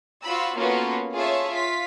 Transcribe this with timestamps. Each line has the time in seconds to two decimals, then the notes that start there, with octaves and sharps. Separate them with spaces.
0.22 F4 F#4 C5 B5 E6
0.56 A#3 B3 C#4 F4 F#4 A4
1.14 F4 G#4 C#5 E5 A5
1.49 F4 B6